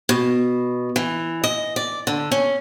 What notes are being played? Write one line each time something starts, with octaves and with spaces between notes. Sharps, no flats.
B2
E3
D#5
D5
D3
C#4